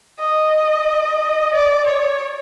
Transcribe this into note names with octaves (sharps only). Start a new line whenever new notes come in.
D#5
D5
C#5